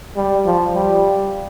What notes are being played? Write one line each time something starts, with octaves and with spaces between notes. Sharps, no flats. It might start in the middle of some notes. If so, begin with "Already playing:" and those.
G3
F3
G3